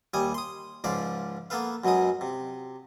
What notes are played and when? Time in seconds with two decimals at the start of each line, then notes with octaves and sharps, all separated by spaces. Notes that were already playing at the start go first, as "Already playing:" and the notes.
0.14 D#2 G3 G#5 D#6
0.34 C6 D#6
0.84 C#2 G#2 F3 D5 F5 B5
1.50 A#3 B3 A4 B4 F5
1.84 F#2 B2 F#3 G#3 D#6
2.21 C3